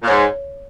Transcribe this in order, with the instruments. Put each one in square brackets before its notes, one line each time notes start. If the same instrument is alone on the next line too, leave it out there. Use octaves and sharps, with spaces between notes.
[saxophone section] A#2
[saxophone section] G#2 [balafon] C#5